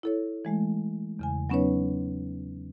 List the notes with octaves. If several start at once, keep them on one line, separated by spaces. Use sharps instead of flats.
E4 A4 C#5
E3 G#3 A3
E2 C#3 G#5
F#3 B3 C#4 D#4 B4 C#5